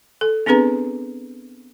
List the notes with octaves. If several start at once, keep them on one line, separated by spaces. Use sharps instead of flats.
A4
B3 C4 D4 G#4 B4 A#5